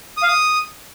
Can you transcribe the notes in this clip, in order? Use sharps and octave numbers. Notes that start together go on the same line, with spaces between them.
D#6
F5
D#6